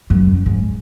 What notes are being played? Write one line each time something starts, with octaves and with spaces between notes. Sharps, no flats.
F#2
F#2
G#2